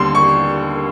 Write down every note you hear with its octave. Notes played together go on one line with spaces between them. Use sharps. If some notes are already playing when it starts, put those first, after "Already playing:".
Already playing: D#2 D3 G3 C6
C#6